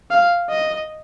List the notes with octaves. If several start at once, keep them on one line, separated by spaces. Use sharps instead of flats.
F5
D#5